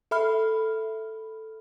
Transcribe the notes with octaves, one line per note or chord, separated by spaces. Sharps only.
A4 E5 B5 F6